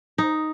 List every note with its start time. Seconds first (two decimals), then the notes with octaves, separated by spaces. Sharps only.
0.18 D#4